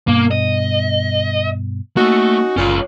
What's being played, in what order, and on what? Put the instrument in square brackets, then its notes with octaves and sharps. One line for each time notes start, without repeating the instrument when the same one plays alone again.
[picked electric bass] G2 B2 [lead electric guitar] A#3
[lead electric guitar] D#5
[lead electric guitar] A3 [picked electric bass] A#3 [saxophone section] C#4 D#4 F#4
[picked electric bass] F#1 [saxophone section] A#2 [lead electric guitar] C#4 F4